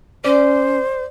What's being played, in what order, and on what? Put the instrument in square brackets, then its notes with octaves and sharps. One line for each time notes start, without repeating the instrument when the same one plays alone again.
[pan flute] C#4 [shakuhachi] C5 [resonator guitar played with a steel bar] D5